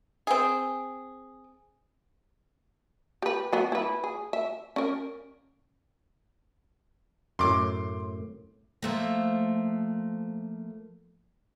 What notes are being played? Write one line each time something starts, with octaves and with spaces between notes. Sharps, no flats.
C4 G#4
G4 B4
F#3 B3
E4 B4
G#4
E5
C#4 A#4
F#2 A2 C6 D6
F3 A3 A#3